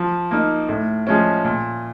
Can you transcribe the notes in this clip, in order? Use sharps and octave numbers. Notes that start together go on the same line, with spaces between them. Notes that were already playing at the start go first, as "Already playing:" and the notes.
Already playing: F3
A#3 D#4
A2
F3 G#3 C#4
A#2